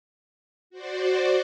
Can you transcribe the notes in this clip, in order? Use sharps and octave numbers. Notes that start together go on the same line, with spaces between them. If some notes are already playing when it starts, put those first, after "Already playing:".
F#4 C5 D5